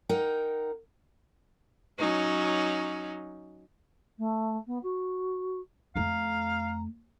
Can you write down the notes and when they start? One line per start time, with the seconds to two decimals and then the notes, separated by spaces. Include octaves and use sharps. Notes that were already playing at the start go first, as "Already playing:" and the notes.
0.09 D#4 A#4 F#5 G5
1.99 F#3 C#4 D#4
4.18 A3
4.66 B3
4.82 F#4
5.95 F2 A3 F5 A#5